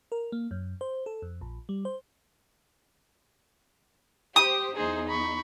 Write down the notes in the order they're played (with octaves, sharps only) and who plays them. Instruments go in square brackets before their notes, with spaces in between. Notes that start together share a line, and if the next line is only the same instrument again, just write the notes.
[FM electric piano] A#4
A#3
F#2
C5
A4
F2
A#1
G3
C5
[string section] G4 C5 [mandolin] D#6
[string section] E2 D#4 [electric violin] G#4 C5
[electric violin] B5 C#6